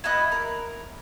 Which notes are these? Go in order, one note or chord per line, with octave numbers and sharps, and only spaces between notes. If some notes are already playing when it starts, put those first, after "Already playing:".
E4 F#4 B4 D#5
A#4